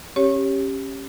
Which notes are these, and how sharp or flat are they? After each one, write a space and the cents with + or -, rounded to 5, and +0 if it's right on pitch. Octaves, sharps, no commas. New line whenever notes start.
C#4 -20 G4 +0 C#5 +0